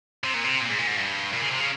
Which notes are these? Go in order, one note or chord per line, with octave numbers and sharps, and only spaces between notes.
C3
A#2
C3
A#2
G#2
A#2
G#2
G2
A#2
C#3
C3
C#3